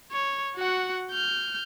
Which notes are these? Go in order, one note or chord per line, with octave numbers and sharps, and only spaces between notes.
C#5
F#4 F#5
F6 G6